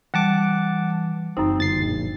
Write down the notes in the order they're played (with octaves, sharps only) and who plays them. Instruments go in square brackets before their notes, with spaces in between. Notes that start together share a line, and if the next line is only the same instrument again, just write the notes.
[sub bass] E3 [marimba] G3 [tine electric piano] F#5 A5 D6
[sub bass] F#1 [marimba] F#2 D#4 [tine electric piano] C4
[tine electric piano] G1 A6 C7
[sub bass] E1 [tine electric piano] A#1